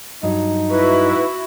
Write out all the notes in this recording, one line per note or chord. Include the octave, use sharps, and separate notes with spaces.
G2 F#3 D#4
E4 F#4 B4